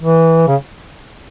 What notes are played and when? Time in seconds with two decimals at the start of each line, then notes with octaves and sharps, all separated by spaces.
0.01 E3
0.47 C#3